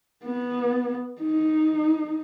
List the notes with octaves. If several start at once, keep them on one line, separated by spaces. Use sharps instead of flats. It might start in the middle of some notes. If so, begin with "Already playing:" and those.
B3
D#4